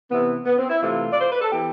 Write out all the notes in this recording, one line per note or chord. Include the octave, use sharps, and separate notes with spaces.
C3 E3 B3
B3
C4
E4
C3 E3 A3 F4
D5
C5
B4
A4
E3 B3 G4